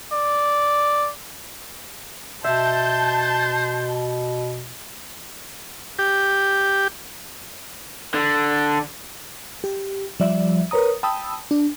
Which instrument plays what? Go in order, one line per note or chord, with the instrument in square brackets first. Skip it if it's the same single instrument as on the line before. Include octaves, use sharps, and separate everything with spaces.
[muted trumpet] D5
[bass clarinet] B2 [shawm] C5 [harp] E5 [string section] A5 G6
[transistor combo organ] G4
[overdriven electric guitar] D3
[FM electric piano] G4
F3 G3 D5 E5
A#4 B4 C#5 A#5 D#6
G5 A5 B5 D#6 E6
D4